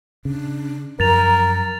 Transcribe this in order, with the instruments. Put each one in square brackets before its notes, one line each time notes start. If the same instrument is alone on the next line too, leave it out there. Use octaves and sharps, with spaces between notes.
[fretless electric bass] C#3 [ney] D4
[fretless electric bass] F#2 F3 [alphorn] A#4 [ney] A#5 [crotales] A6 F7